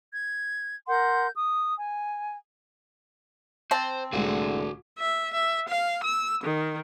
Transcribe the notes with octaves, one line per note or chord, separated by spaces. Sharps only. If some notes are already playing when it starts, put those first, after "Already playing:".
G#6
A#4 F#5 C6 G6
D#6
G#5
C4 C5 A5
C2 A2 D3 G#3 F#4 G#4
E5
E5
F5
E6
D#3